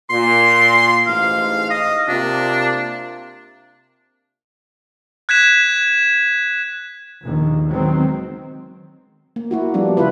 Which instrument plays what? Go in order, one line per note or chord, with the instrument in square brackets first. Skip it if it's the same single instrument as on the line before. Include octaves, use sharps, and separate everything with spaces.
[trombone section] A#2 [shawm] C6
[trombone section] A1 G#2 [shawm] F5
[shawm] D#5
[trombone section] C3 A#3 F4 [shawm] D4
[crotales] F#6 G#6 B6 E7
[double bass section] A#1 D#2 D#3
D#3 F#3 G#3 B3 C4
[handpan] A#3
A#3 E4 F#4
F3 G3 B3 D4
C#3 A#3 E4 F4 B4